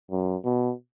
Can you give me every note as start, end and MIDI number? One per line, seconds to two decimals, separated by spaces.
0.11 0.36 42
0.44 0.73 47